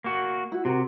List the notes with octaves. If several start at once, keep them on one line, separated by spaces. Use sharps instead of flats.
A#3 F#4
E4 F#4
C3 F#4 A#4